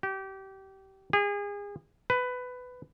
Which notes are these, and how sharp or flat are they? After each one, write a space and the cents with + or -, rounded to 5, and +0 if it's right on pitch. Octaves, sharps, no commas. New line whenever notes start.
G4 -25
G#4 -35
B4 +15